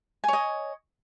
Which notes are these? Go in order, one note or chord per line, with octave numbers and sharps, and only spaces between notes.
C#5 D#5 G#5